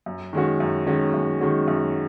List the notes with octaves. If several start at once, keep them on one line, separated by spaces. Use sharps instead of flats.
F#2
D#3 G#3 C#4 F#4
F#2
D#3 G#3 C#4 F#4
F#2
D#3 G#3 C#4 F#4
F#2